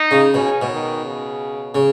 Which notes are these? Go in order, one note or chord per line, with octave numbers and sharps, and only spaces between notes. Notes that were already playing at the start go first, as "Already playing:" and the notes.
Already playing: D#4
C#3
B2 C#4
B2
D#3
C#3
C#3